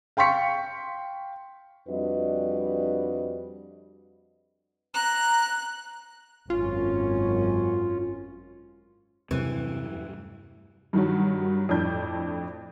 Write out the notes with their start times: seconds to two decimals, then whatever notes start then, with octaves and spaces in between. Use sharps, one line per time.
0.17 F5 G5 C6 C#6 B6 C#7
1.89 F2 G3 D4 F#4 B4 D#5
4.95 A#5 F#6
6.50 G#1 F#2 C#4 F4
9.31 E2 G2 C3 E3 F#3 A3
10.93 G2 D#3 F#3
11.69 F2 A2 D4 G6